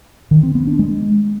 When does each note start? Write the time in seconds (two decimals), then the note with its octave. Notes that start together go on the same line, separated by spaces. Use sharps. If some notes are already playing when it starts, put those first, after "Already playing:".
0.31 D#3
0.43 C4
0.55 B3
0.67 D4
0.79 G#3